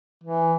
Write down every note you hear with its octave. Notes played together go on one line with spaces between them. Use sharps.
E3